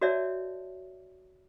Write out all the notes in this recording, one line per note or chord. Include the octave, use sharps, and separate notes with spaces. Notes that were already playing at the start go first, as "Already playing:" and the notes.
F#4 A#4 C#5 D5 E5 A5